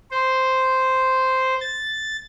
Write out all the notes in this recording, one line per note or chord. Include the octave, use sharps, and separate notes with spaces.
C5
A6